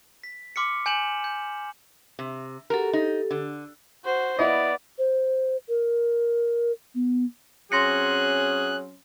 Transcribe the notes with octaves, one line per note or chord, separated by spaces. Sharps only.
B6
C6 D6 F6 B6 C#7
G#5 G6 C#7 E7 F#7
G6
C3
F#4 G4 A4 A#4
D#4
D3
F#4 C5
B3 E4 D5 D#5
C5
A#4
B3
F#3 C4 C#4 G#4 C6 F#6 A#6 C#7